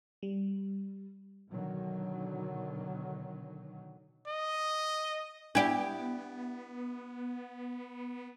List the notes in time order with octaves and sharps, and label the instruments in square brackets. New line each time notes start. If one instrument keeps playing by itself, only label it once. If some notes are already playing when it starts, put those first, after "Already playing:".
[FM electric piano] G3
[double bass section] B2 D3 D#3 F#3
[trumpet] D#5
[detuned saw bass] B3 [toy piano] D4 D5 [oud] E4 G4